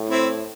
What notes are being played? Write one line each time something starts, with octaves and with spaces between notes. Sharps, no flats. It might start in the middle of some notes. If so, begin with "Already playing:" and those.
Already playing: A2
C4 E4